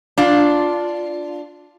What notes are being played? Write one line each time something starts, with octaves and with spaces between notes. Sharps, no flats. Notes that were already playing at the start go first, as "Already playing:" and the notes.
D4 F4